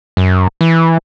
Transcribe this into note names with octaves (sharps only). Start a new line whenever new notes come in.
F#2
E3